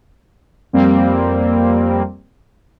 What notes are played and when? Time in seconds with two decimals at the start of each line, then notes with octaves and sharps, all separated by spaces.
0.73 F2 G3 A#3 C4